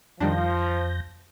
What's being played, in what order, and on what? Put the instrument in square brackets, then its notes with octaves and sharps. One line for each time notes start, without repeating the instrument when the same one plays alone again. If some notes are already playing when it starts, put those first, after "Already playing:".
[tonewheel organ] F2 G6 A#6 [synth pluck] D#3 G3 D4 [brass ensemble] F3